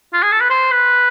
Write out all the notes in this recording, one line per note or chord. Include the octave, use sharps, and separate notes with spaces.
F4
G#4
A4
B4
C5
B4